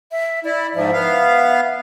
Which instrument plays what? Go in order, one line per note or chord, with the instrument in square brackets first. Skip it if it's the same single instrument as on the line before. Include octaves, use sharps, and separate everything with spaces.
[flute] E5
[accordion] E4 [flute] D5
[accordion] G#2 F3 [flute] E5
[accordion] B3 F5